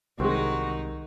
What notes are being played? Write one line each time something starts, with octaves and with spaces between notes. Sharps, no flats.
C2 D#3 G#3 C4 D#4 F#4